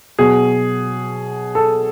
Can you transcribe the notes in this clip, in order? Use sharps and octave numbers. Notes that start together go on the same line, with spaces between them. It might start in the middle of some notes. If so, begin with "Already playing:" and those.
B2 F#3 G#4
A4